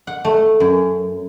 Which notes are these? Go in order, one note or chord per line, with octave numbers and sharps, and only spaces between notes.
F#5
A3
F#2